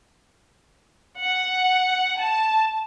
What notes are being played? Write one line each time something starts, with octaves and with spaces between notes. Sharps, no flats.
F#5
A5